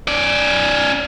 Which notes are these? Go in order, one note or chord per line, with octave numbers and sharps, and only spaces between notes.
C#4 D5